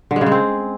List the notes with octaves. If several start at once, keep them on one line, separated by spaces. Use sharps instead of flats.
D3
G#3
C#3
G#3
C4